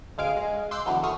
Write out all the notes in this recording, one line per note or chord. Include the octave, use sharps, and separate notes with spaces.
D2 G#3 F5 G#5 D7
G#3
C6 D6 E6 F#6 G6
D3 E3 F#3 B3
G#1 A3 C#6 D#6 F6